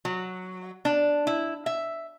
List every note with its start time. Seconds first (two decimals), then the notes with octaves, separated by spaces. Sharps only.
0.05 F#3
0.85 D4
1.27 E4
1.66 E5